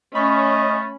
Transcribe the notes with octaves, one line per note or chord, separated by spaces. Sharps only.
A3 C#4 D#5 B5 C#6